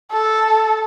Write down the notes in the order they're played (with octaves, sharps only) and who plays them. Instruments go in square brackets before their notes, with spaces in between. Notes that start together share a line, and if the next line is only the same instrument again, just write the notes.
[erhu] A4